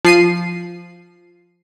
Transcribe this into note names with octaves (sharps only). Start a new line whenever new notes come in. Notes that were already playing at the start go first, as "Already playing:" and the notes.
F3 C7 D#7